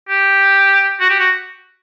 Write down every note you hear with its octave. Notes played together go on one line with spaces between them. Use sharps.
G4
F#4
G4
F#4